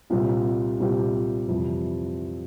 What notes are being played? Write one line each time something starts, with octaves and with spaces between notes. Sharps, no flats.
C2 A#2 G3 C4 G4
C2 A#2 G3 C4 G4
F2 C3 E3 G3